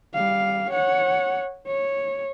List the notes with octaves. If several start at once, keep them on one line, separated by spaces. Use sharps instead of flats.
G3 F5
C#5 F#5
C#5